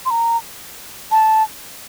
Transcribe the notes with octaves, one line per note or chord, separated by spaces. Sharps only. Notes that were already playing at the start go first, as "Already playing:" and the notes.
C6
A#5
A5